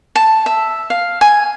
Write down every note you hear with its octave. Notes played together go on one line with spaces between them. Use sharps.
A5
E5
F5
G#5